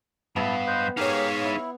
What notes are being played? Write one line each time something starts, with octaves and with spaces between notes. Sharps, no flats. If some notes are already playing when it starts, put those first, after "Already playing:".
G2 B3 E4 F5 A5
B4 C5 D#5
D#4 G4 G#4 A#4 C#5 F5 G#5
E4